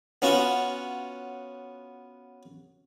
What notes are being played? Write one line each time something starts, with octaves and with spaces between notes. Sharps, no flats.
B3 C#4 F4 F#4